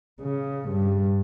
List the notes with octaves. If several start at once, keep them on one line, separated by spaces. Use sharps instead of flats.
C#3
G2